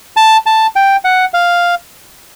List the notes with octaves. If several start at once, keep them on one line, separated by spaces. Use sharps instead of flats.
A5
A5
G5
F#5
F5